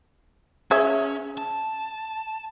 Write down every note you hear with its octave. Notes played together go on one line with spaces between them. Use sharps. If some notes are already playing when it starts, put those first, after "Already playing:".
C#4 G#4 C#5 E5
A5